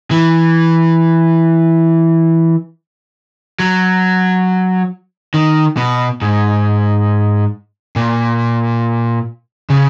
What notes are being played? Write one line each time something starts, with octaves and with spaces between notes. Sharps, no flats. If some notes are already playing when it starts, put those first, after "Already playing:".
E3
F#3
D#3
B2
G#2
A#2
C#3